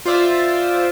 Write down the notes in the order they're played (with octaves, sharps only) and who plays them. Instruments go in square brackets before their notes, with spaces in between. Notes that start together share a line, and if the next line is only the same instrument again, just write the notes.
[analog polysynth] F4 C5 D5 E5